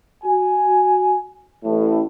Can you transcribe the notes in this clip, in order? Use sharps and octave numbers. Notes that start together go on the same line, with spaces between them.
F#4 G#5
A1 A2